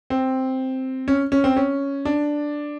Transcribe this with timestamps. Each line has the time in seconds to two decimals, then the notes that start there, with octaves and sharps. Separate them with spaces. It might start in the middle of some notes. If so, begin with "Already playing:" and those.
0.10 C4
1.08 C#4
1.32 C#4
1.44 C4
1.56 C#4
2.05 D4